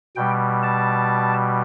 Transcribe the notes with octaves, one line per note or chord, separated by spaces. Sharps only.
B2 G3 G5
A5